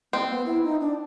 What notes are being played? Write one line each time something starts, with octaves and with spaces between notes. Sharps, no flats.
A#3 C4
B3
E4
D#4
D4